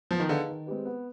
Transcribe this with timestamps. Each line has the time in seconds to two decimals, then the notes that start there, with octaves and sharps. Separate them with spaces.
0.11 F3 B3
0.20 D#3
0.29 D3 D#4 G#4 B4 F5
0.48 D#3
0.66 G#3 C4 G4 B4
0.85 B3